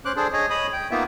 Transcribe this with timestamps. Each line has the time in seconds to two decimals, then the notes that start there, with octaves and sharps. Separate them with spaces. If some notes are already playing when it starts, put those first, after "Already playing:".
0.05 C#4 C5 D6 F#6
0.16 D4 G#4 A4 C5
0.33 G#4 C#5 D#5
0.50 C#5 D#5 B5 D#6
0.73 G5
0.91 A#3 B3 D#4 F4 E5